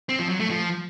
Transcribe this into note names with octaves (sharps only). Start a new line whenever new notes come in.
C4
F3
F#3
A3
F3